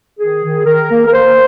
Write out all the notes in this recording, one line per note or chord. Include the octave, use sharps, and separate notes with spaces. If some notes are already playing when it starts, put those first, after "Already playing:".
D#3 G#4
D#3
D#3 A#4
A#3
A#4
A#3 C5